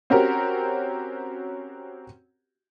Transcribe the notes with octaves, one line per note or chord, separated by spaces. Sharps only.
C4 C#4 F#4 G4 A#4